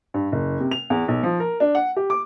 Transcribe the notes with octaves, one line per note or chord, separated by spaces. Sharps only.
G2
F#1
C3
F7
E2
B1
F3
A#4
D4
F#5
G4
D6